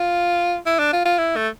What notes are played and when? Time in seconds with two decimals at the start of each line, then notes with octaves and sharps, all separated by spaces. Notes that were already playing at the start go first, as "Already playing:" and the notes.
Already playing: F4
0.66 E4
0.79 D4
0.93 F4
1.05 F4
1.18 E4
1.36 A3